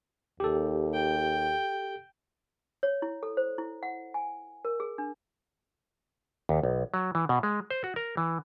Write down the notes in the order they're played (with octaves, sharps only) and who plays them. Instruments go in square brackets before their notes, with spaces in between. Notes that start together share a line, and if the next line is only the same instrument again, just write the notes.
[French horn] D#2 [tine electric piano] G4 A4
[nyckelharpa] G5
[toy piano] C#5
E4
A4
C5
E4
F#5
G#5
A#4
G#4
D4
[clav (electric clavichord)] D#2
B1
F#3
E3
B2
G#3
C5
F#4
A#4
E3